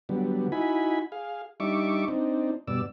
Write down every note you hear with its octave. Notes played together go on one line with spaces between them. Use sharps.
D3 F#3 G3 B3
D#4 E4 F#4 G#5 B5
G#4 F5
G3 D4 D#4 E5 C#6 D6
C4 D4 D#4
G2 B2 D5 E6